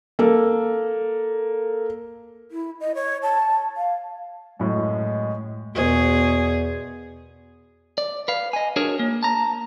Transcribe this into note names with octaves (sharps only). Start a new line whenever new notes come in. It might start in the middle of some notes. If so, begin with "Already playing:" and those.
A#3 A4
E4
D#5
C#5
A5
F5
F#2 A2 G#3
E2 B2 G#4 A#4 C5
D5
B4 F5
D#5 G#5
D4 F#4 G#4 A#4 C#5
A#3
A5 A#5